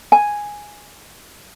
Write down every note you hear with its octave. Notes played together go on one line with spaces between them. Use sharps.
G#5